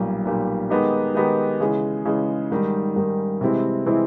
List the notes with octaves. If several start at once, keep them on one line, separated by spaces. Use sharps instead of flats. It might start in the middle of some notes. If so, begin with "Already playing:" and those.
Already playing: B1 A#2 G3
B1 A#2 G3
D#3 G#3 B3 D#4 G4
D#3 G#3 B3 D#4 G4
C#3 E3 G#3
C#3 E3 G#3
G#2 D#3 G3
G#2 D#3 G3
C3 E3 G#3 C4 E4
C3 E3 G#3 C4 E4